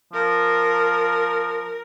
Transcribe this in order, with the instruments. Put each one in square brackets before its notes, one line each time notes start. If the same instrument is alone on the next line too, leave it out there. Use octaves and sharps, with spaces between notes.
[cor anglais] F3 [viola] A#4